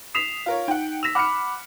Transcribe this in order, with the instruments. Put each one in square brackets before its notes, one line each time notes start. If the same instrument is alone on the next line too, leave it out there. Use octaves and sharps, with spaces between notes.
[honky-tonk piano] D#6 B6 [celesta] C7 E7 F7
[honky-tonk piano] F4 A#4 C#5 [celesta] F5
[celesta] D#4 [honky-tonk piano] F#5 G5
[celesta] E6 A#6 [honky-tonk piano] B6 E7 F7
[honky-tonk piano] F#5 F6 C#7 [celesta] B5 D6